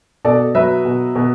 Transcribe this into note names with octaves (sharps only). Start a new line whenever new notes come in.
B2 A4 D5
F#3 B4 E5
B2
B2